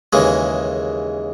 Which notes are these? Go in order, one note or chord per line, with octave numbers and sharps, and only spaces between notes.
D#2 C#3 E3 G#3